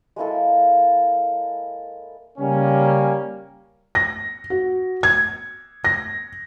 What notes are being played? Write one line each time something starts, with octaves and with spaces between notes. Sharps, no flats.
G#3 A#3 E4 A4
C#3 G3 A#3 C#4
A#6
F#4
G#6
A#6